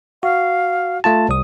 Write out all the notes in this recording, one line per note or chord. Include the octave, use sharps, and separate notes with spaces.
F#4 F5
A3 F4 A5
C2 D#6